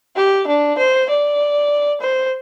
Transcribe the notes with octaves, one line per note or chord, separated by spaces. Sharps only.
G4
D4
C5
D5
C5